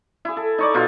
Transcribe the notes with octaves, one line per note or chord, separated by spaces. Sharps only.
E4 G#4
A4
D#4 C#5 D5
B2 D#4 F4